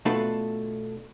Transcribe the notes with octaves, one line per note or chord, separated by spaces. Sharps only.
B2 A3 D4 F4 A4 B4